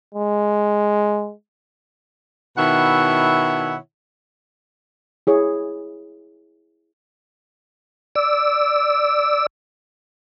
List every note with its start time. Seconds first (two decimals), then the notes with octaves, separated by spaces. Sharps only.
0.15 G#3
2.57 B2 D#3 E4 C#5 E5 F#5
5.27 E4 G#4 C#5
8.16 D5 E6